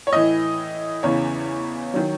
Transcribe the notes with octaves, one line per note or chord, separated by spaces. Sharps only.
C#5
A2 E3 D#5
E2 C#3 E3 C#5
D#3 F#3